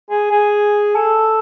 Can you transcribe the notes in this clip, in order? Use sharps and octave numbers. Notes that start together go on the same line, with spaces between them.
G#4
G#4
A4